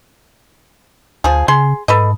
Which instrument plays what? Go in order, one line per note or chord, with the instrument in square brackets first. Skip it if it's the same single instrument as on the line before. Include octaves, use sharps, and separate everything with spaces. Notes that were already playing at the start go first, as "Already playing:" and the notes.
[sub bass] D2 [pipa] F3 G#4
[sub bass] C#3 [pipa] G#4 C6
[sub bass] G#2 [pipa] A4 B4 D#5